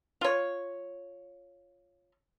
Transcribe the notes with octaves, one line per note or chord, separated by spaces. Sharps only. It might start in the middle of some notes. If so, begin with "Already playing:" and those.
F4 C#5